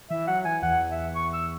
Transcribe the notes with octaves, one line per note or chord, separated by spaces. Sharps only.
E3 E5
F#3 F#5
E3 G#5
E2 F#5
E5
C#6
E6